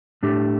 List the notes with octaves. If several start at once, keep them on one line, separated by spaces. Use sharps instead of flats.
A2 A3 D4 G4